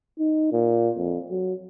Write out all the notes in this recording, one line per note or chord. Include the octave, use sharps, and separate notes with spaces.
D#4
A#2
F2
F#3